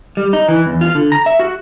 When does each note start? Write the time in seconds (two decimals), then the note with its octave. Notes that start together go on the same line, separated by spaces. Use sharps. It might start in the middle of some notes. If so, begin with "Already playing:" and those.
0.17 G3
0.33 D#4
0.49 E3
0.66 E2
0.81 F4
0.95 D3
1.12 A#5
1.26 E5
1.39 F#4